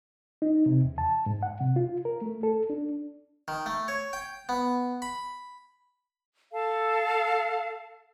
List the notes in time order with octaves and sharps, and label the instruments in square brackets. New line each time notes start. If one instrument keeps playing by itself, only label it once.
[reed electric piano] D#4
C3
E2
A5
G#2
F#5
C3
F4
A#4
A3
A4
D4
[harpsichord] D#3
A3
C#5
G5
B3
B5
[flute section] A4 F5 A5